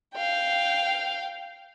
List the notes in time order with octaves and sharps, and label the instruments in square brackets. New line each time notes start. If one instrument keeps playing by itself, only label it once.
[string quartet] F5 G5